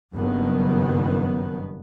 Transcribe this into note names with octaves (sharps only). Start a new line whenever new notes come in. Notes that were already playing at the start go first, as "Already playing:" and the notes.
F#1 G2 D#3 B3